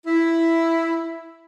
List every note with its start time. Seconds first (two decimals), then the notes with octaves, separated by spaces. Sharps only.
0.07 E4